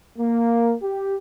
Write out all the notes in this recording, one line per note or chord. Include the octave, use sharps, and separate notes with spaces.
A#3
G4